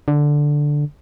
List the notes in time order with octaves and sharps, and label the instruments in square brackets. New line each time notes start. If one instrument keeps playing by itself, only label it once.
[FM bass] D3